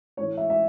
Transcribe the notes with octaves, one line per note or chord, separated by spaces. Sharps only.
A2 E3 C#5
E5
E5